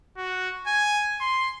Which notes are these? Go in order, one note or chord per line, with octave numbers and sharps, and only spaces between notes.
F#4
G#5
C6